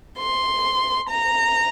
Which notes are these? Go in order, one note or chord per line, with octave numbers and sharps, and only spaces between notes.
C6
A#5